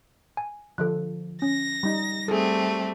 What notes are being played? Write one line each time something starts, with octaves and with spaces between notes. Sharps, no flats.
G#5
D3 F3 A4 F#6
C#4 A#6
G3 D#4
G3 A3 C4 G#4 A4